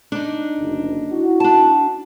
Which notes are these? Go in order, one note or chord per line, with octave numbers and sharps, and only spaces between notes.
D4 D#4
F#1 D2
E4 F#4
D4 A5